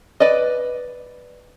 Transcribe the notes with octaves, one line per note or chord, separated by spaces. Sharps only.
B4 D5 D#5